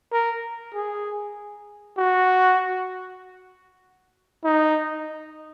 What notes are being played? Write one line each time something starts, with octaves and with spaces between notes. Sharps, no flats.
A#4
G#4
F#4
D#4